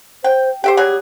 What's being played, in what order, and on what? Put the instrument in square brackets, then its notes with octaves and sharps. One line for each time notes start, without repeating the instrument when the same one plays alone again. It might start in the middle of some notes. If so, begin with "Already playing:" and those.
[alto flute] C5 [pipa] G5
[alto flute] G4 [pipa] C5 E5 G5
[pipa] F#3 G3 G#4